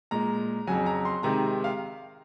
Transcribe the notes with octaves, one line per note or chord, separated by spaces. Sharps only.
A#2 G#3 A#5
F2 C#3 F#3 G#5
A#5
C6
C3 D#3 G#3 A#5
F5